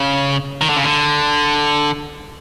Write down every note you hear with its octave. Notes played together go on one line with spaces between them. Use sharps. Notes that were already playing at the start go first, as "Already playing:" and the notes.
Already playing: C#3
D#3
D3
C#3
D3